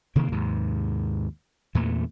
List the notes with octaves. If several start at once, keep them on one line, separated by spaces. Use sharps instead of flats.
C3 D#3 E3 A#3
D#2 G#2 C3
E2 A#2 E3 A3